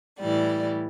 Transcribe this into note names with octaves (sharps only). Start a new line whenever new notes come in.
A2 E3 G3 D5